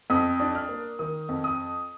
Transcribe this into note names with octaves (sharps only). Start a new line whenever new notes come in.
F2 D#6
D4
F6
A#3
D#3 D#6
F2
D#6